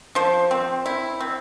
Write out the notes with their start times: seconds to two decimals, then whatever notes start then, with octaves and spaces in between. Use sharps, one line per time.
0.15 F3 C5
0.51 C4
0.86 E4
1.21 C4